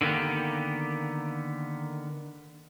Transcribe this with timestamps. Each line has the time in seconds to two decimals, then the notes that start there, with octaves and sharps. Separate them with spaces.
0.01 D3 D#3 A#3 B3 G4